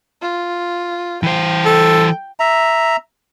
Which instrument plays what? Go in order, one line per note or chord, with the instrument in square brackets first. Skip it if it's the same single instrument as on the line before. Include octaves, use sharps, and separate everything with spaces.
[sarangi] F4
[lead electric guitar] E3 C5 [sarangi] G5
[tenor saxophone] A4
[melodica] E5 A#5